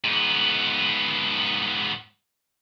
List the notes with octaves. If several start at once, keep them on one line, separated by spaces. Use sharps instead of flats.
G#2 B3